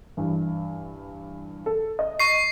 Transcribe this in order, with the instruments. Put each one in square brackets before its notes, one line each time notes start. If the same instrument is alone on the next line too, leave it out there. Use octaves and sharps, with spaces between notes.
[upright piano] G2 E3
A4
D#5
[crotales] C#6 C7